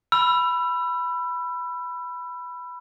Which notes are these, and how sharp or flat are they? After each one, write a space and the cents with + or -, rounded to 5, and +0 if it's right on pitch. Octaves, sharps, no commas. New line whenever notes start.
B5 +0 E6 +30